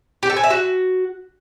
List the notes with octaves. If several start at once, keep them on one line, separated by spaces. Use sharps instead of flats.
G4
A4
G#5
E5
F#4